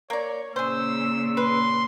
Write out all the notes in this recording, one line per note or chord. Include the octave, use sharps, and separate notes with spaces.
A#3 C#5 D5
A#2 C#3 G#4 C5 E6
B4 C6